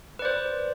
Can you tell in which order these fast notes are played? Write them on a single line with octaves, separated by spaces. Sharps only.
B4 D5 C5